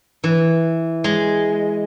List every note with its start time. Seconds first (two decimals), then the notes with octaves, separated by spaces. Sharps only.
0.24 E3
1.04 G#3